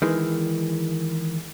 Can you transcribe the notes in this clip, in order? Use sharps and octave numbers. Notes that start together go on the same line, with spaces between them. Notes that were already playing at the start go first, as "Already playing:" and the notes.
D#3 E3 G#3